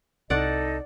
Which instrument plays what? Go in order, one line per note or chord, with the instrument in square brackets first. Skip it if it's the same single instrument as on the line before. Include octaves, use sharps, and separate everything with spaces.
[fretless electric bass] C2 [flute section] D#4 A4 D#5 [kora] D5 F#5